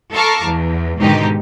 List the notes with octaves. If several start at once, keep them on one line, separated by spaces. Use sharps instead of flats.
A4 F5 A5 A#5 C#6 D6
E2
G#2 B2 D3 D#3 D#4 G4